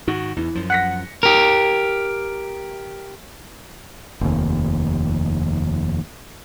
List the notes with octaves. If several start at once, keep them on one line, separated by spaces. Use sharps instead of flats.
G#2 D#3 F#4
E2 E3
F#2 F3
F#5 A#6 B6 C#7
G4 A#4
F1 D#2